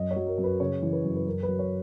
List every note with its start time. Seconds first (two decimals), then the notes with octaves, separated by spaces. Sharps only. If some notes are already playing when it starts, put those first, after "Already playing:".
Already playing: F#2 D#5
0.11 C#5
0.16 F#3
0.27 A#4
0.38 F#2
0.44 B4
0.60 C#3 C#5
0.82 E3
0.93 B4
1.04 F#2
1.16 B4
1.26 F#2 A#4
1.43 B4
1.48 F#3
1.59 C#5